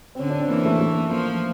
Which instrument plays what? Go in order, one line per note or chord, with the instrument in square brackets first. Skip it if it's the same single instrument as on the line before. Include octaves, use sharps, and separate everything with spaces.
[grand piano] C4
[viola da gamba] D3 [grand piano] C#4
[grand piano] D4
C4
[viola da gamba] E3 [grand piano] A#3
[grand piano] A3
A3
[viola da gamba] F3 [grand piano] A#3